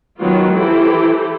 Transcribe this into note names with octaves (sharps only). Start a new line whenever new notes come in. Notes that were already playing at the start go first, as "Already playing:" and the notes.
D#3 F#3 B3 F4
E3 E4 G4 A4 C5